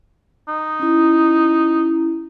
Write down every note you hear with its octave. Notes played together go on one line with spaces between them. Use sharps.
D#4
C#4 E4